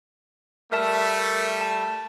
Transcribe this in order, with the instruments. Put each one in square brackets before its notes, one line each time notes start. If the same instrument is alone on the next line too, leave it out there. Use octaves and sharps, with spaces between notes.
[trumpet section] G3 A3 [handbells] A#4 E5 A5
[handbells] A5